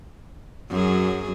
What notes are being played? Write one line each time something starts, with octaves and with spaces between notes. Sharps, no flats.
F#2 F#3 G#4